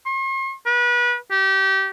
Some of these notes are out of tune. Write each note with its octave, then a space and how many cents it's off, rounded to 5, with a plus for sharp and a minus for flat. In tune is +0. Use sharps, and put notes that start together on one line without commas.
C6 +45
B4 -30
G4 -25